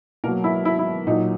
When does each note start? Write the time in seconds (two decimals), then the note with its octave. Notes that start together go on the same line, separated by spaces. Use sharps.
0.24 B2 A#3 A#4
0.28 F#3
0.44 E4
0.65 E4
0.79 E4
1.07 A#2 F#3 D#4